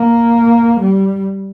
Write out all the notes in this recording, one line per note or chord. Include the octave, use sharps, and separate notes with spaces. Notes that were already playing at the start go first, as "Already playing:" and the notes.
Already playing: A#3
G3